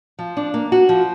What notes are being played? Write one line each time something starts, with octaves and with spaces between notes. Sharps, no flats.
F3
D4
A#3
F#4
F3